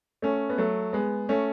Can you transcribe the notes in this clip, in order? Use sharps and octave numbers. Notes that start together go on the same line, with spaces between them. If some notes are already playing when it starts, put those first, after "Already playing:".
A3 C#4
B3
F#3 A3
G#3 B3
A3 C#4